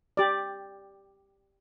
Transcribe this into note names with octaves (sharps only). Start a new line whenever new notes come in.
G4 D5